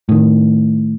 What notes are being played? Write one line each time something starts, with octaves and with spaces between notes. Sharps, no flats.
A2 D#3